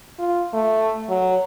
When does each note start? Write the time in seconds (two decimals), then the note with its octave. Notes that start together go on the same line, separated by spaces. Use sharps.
0.19 F4
0.53 A3
1.09 F#3